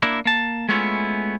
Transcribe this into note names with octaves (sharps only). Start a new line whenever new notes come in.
A#3 D4 E4 A#4
A#3 A5
G#3 A3 B3 C#4 E4 F4